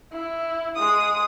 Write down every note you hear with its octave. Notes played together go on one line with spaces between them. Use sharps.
E4
G#3 D#6